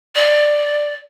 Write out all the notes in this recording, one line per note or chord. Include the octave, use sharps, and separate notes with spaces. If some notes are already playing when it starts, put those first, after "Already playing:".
D5